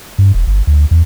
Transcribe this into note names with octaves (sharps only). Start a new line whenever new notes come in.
G2
E1
G1
D2
E2